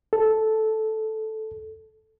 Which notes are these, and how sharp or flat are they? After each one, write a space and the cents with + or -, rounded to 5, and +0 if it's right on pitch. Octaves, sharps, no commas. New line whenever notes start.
A4 -5